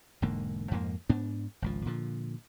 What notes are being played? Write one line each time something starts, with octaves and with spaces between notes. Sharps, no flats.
E1 G#2 D3 A#3
F2 G#2 F3 A#3
G#2 B3 D4
G#1 C#2 F3
A#2 D3 F3